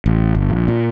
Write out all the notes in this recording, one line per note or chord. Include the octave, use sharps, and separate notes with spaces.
A1
G1
A#1
A#2